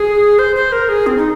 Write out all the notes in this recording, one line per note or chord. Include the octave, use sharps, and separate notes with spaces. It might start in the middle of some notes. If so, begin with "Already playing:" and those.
Already playing: G#4
C5
C5
A#4
G#4
C4
D#4